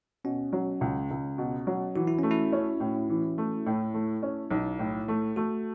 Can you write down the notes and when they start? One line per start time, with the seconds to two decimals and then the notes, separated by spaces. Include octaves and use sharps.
0.24 B2 C#4
0.53 F#3
0.81 C#2
1.11 C#2
1.38 B2
1.67 F#3
1.96 E3 F#4
2.07 E4
2.18 A3 C#4
2.31 E4
2.53 C#4
2.80 A2
3.09 E3
3.38 A3
3.66 A2
3.94 A3
4.23 C#4
4.51 B1
4.79 A2
5.08 A3
5.36 A3 F#4